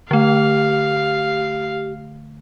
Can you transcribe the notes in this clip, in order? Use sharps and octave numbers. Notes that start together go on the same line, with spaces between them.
D3 A3 G4 F5